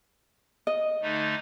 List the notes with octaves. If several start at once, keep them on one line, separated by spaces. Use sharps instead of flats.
D#5
D3 A3 D#4